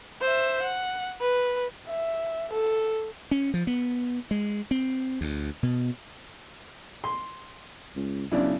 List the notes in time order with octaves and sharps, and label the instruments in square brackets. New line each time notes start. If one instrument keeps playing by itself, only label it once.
[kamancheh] C5 E5
F#5
B4
E5
A4
[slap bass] C#4
F3
B3
G#3
C4
D2
B2
[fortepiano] C6
[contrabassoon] C#2
[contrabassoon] B1 [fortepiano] C#3 D4 E4